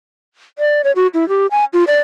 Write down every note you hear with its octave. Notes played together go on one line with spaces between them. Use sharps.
D5
C#5
F#4
E4
G4
G#5
F4
D5